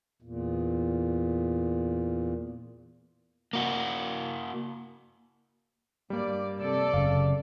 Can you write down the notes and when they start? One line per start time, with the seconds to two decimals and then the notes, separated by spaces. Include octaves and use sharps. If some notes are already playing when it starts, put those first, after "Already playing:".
0.22 E2 A#2
3.53 A#3 F#4
6.10 G2 G3 A#3 D5
6.59 C3 A4 D5
6.94 F#1 C#3 F5